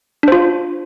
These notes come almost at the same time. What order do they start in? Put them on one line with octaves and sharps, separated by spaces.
D4 C5 F4